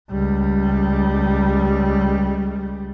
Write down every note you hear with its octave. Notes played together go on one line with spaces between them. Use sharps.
C#2 G3